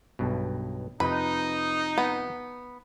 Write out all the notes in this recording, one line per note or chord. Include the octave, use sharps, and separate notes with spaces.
B1 G2 B2
F2 C3 D#4 B4
B3